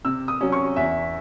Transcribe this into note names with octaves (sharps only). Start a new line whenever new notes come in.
C3 E6
D#6
F#3 C#4
C#6
E2 E5